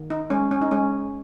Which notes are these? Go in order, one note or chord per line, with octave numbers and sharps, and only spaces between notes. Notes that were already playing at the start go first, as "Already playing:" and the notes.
Already playing: D#3
D#4
G#3 C#4
C#4
D#4
G#3 C#4